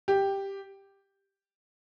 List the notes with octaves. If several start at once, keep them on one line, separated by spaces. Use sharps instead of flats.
G4